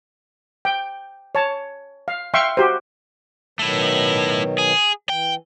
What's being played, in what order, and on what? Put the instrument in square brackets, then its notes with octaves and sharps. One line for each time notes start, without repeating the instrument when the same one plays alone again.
[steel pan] G5
C#5 A5
F5
E5 F5 G5 C6 C#6
F#4 G4 C5
[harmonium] B2 D#3 F#3 [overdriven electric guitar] A3 E4
[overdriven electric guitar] G#4
[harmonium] E3 [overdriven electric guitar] G5